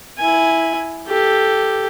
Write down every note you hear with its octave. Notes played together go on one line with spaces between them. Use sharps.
E4 G#5
G4 A4